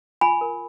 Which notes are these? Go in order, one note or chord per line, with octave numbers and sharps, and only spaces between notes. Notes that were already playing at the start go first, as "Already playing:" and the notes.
F4 G#5 B5
A#4